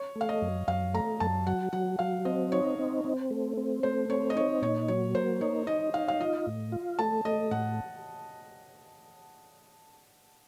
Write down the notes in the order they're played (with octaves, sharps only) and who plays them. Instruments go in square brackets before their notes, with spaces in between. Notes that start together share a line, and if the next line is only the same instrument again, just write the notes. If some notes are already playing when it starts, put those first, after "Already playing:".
Already playing: [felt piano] C#5
[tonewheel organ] A3
[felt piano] F5
D#5
[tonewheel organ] F#2
[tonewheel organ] F#2 [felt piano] F5
[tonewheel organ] A3 [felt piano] A#5
[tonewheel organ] F#2 [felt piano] A5
[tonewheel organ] F#3 [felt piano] F#5
[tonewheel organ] F#3 [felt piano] F#5
[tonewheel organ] F#3 [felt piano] F5
[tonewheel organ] C4 [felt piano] D#5
[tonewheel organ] D#4 [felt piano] C#5
[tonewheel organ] C4
C4
A3
C4
[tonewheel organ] A3 [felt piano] C5
[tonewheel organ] C4 [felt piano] C#5
[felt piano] D#5
[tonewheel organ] D#4 [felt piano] C#5
[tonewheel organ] A#2 [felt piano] C#5
[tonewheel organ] F#3 [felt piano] C#5
[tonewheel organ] A#3 [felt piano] C5
[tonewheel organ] D#4 [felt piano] C#5
[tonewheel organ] D#4 [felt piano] D#5
[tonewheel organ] D#4 [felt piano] F5
[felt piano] F5
[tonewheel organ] F4 [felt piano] D#5
[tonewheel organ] A2
F4
[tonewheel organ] A3 [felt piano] A5
[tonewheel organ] A3 [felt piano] D#5
[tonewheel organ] A2 [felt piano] F#5